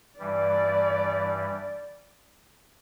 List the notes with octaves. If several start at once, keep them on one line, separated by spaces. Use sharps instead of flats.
G2 E3 G3 D5